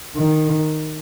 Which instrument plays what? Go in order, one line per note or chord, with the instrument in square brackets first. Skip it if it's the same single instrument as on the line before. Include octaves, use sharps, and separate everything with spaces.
[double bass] D#3